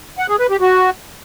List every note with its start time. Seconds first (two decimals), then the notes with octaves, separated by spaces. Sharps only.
0.18 F#5
0.29 G#4
0.39 B4
0.50 G4
0.61 F#4